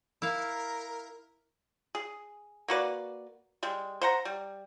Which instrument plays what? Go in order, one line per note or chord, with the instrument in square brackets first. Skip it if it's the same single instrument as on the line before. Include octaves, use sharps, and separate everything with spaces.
[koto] E4 F5 [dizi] A#4
[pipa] G#4
A#3 F#4 B4 D5
G3 G#3
C5 F#5 A#5
G3